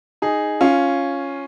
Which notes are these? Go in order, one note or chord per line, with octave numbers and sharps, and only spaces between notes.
D#4 G#4
C#4 F4